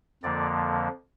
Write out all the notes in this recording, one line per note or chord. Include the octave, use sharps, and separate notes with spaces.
F2 D3 F3 A#3 D5